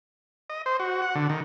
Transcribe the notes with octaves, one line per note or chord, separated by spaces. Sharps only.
D#5
C5
F#4
F#5
D3
D#3